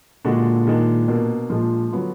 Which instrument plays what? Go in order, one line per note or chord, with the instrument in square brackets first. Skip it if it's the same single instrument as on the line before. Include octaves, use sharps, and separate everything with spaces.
[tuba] A#2 [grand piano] D3 G#3 D4 F#4
[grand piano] D#3 G#3 D4
B2 A#3 D4
[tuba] A#2 [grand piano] F3 G#3 D4
[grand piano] D3 F#3 B3 F4